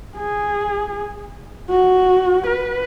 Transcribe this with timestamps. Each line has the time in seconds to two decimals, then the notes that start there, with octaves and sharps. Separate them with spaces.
0.16 G#4
1.69 F#4
2.47 B4